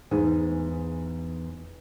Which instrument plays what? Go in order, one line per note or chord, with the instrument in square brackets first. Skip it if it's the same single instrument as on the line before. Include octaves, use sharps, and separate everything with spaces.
[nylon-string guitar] E2 [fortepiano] G#2